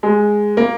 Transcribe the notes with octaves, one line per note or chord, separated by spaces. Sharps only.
G#3
A#3